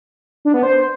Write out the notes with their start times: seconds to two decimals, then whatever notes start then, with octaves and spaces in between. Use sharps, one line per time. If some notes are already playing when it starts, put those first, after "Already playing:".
0.45 D4
0.54 B3
0.63 C5